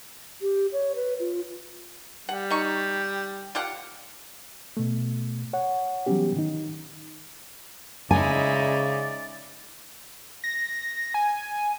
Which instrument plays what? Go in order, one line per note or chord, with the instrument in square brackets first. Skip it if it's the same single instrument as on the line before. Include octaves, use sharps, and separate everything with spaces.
[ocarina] G4
C#5
B4
F4
[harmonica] G3 [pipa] F#5
[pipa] D#4 C#6
F4 G4 F#5
[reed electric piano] B2 A3
C#5 F#5
E3 F#3 G3 B3 C#4 G4
D#3 D#4
[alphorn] C#3 [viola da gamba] G#3 D#4 E4 [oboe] D5 [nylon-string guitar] G#5
[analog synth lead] A#6
G#5